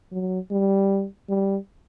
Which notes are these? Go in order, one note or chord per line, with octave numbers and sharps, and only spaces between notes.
F#3
G3
G3